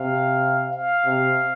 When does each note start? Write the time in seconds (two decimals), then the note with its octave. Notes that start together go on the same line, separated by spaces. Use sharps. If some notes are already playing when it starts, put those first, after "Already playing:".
Already playing: C3 F5
0.73 F5
1.06 C3